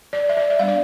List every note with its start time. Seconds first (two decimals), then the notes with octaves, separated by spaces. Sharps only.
0.13 D5
0.29 E5
0.37 D5
0.50 E5
0.59 G3 B3 D4 F5
0.68 D5